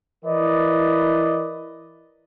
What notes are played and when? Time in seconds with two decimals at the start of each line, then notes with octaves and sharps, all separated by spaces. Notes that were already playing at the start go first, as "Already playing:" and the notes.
0.24 E3 E4 A#4 B4 D5 D#5